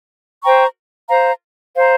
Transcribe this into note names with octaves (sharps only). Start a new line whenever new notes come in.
C5 G5 A#5 C#6
C5 F5 A#5
C5 F5 A#5